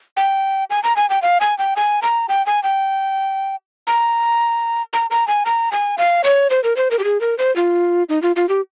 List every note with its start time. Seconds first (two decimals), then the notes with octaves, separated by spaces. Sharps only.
0.17 G5
0.70 G#5
0.84 A#5
0.97 G#5
1.10 G5
1.22 F5
1.41 G#5
1.58 G5
1.76 G#5
2.02 A#5
2.29 G5
2.46 G#5
2.63 G5
3.87 A#5
4.93 A#5
5.11 A#5
5.28 G#5
5.45 A#5
5.72 G#5
5.98 F5
6.24 C#5
6.50 C5
6.64 A#4
6.77 C5
6.91 A#4
6.99 G4
7.04 G#4
7.21 A#4
7.38 C5
7.56 F4
8.09 D#4
8.22 F4
8.36 F4
8.49 G4